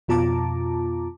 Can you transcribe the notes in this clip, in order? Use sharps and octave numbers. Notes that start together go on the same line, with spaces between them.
F2 B2 F4 A5 A#5 D6